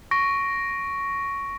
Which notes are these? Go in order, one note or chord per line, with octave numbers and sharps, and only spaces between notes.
C#6 A#6 D7